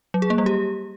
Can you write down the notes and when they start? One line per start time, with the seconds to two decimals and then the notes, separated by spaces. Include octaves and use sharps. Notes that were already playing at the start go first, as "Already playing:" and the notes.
0.14 F#3
0.22 G#4
0.30 A#3
0.38 G3
0.46 G4